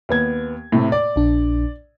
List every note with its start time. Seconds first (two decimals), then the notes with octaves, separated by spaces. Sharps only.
0.09 D#2 B3 G#6
0.72 A2 C3
0.92 D5
1.16 A#1 D4